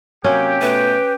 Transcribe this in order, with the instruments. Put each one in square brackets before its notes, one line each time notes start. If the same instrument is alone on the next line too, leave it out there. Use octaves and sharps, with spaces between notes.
[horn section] C3 F#3 A#3 [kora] C#4 [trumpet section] G4 G5
[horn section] B2 A3 [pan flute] B4